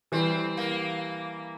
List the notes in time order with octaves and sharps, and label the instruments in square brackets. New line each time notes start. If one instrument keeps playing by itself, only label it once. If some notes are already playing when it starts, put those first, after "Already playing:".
[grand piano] E3 G3 [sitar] C4
[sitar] A#3